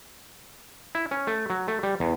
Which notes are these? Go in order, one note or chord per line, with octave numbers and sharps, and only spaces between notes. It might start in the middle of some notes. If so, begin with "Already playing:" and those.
E4
C#4
A3
F#3
A3
G3
E2